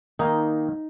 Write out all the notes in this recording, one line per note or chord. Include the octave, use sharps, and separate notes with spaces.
D#3 A#3 D#4